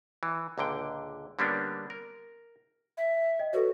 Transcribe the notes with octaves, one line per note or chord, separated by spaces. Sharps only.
E3
C#2 A#2 D3 G5
D3 G3 A#3 B3 C#4 D4
A#4
E5
D#5 G5
F#4 A4 B4 C#5